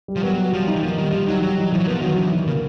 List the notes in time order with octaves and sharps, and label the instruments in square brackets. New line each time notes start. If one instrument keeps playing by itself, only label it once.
[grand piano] G3
[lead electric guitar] F3
[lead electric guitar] F#3 [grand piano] B3
[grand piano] F#4
[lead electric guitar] F3 [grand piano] G3
[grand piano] D#4
[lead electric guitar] E3
[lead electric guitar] F3 [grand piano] A#3
[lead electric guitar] D#3 [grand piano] G3
[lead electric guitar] F3 [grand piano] G3
[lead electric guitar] F#3 [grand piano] D#4
[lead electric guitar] F#3 [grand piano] G3
[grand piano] E3
[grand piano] E3 [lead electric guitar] F3
[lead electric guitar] F#3
[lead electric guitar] F3 [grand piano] B3
[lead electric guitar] D#3 [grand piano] F#3
[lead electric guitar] E3 [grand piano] D4
[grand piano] D#3
[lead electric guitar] C#3 [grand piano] A#3